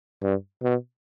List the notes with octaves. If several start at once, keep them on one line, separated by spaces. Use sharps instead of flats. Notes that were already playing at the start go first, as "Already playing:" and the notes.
G2
B2